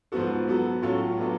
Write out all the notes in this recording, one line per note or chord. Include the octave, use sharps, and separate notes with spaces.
G#2 F3 B3 F#4 A4
F#3 B3 F#4 A4
A2 F#3 C#4 F4 A4
F#3 B3 D4 F4 A4